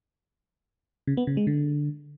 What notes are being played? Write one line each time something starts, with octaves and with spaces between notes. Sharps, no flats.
C#3
B3
C#3
G#3
D3